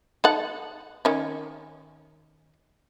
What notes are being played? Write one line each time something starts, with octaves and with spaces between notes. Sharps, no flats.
D#4 A4 F#5
D#3 C#4